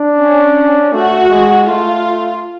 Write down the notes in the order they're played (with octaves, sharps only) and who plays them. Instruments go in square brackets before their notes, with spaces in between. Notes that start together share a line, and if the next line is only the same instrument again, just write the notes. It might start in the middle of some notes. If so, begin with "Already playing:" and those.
Already playing: [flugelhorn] D4
[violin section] C#4
[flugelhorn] A3 [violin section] F#4
[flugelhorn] G#3
[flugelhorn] A3 [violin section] F4